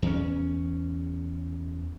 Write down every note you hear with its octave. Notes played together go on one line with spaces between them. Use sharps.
E2 C#4